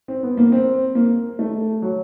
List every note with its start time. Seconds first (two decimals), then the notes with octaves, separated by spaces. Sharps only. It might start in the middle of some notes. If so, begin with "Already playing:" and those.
0.08 C4
0.23 B3
0.37 A#3
0.52 C4
0.95 A#3
1.39 A3
1.82 F#3